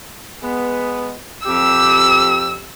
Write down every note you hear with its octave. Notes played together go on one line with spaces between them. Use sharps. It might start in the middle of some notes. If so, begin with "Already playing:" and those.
G#3 B3
F2 G4 E6